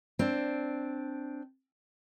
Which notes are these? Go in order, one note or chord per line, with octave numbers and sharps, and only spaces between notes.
C4 D4